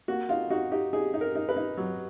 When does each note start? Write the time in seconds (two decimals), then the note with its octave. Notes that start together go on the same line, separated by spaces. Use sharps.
0.08 A#3 F#4
0.29 D#4 F4
0.50 D#4 F#4
0.72 D#4 G4
0.93 D#4 G#4
1.14 D#4
1.21 A#4
1.35 D#4
1.49 B4
1.56 D#4
1.77 F#3